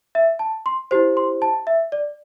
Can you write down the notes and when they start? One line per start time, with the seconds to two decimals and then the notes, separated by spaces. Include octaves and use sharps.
0.15 E5
0.39 A5
0.66 C6
0.91 E4 G4 C5
1.17 C6
1.42 A5
1.67 E5
1.92 D5